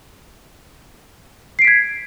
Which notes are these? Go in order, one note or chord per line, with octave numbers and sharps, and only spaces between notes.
G#6 B6 C7 D7